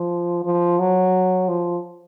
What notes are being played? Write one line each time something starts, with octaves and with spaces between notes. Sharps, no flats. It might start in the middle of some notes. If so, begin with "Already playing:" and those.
Already playing: F3
F3
F#3
F3